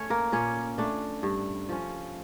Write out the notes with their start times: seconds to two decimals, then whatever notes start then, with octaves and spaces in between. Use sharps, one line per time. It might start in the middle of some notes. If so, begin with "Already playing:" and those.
Already playing: A3 C#4 C#5
0.10 A#3 A#4
0.32 A#2 C#4 C#5
0.78 A3 D4
1.23 G2
1.69 F3 C#4